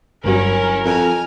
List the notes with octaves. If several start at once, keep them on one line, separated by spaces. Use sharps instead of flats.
G1 G2 F#3 C#4 E4 A#4
F2 G#5 A#5 F6